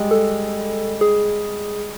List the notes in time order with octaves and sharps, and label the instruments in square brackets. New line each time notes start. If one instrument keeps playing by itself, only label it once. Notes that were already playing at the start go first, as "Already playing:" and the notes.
Already playing: [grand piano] G3 G#3
[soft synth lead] A4
G#4